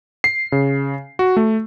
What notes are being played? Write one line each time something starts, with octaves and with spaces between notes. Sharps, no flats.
C7
C#3
F#4
A3